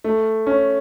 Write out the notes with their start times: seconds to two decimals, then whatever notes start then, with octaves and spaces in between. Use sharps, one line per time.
0.04 A3
0.47 C#4